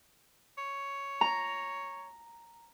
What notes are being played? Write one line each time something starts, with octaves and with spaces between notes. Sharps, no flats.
C#5
A#5